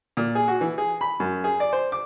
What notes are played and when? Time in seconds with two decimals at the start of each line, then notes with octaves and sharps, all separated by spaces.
0.17 A#2
0.35 G#4
0.48 F#4
0.61 E3
0.78 G#4
1.01 B5
1.20 F#2
1.44 G#4
1.60 D5
1.73 C5
1.92 D6